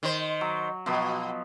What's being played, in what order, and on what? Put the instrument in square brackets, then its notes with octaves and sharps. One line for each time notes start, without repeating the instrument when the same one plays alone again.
[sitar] D#3 C5
[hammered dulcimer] F#3
[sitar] B2 [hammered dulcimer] F3 F#3 B3